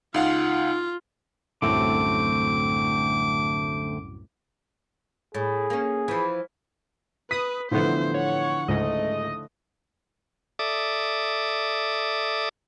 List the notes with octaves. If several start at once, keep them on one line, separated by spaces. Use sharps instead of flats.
C#2 D#4 F4 F5 F#5
C2 F#2 A2 D3 A3 C4 D6
A2 G#4
A#3 C#4
E3 F3
B4 D#6 B6
A2 D3 E3 F3 B3 C5 E5
C#5 F#5
C#2 G#2 A3 D#5
A4 D5 E5 D6 D#6